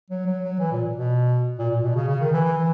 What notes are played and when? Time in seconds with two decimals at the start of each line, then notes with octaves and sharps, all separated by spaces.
0.10 F#3
0.27 F#3
0.44 F#3
0.60 E3
0.72 A#2
0.96 B2
1.59 A#2
1.71 A#2
1.83 B2
1.96 C#3
2.08 C#3
2.20 D#3
2.33 E3
2.45 E3
2.57 E3